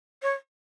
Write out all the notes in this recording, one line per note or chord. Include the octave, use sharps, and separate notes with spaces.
C#5